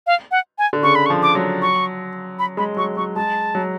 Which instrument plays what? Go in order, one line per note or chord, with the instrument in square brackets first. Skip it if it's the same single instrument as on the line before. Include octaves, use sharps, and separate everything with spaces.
[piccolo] F5
F#5
G#5
[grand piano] D3
[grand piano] C#3 [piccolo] C#6
[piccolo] B5
C#6
[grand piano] F3
[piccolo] D6
[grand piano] F#3
[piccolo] C#6
B5
[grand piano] G#3 [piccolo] B5
[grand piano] F#3 [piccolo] C#6
[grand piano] F#3 [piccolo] C#6
[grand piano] G#3 [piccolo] A5
[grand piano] F#3